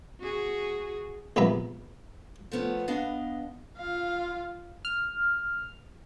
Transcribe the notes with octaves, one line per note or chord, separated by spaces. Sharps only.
F#4 G#4
A#1 C3 B3 E5 A#5
F3 A3 B3 C#4
B3 D4 D#5 F5
F4 F5
F6